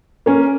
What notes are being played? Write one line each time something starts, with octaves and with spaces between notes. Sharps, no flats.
A#3 C#4